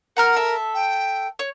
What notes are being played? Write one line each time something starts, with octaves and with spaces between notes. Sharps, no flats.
A#4 F#5 A#5 F6
A4 E5
G5
C#5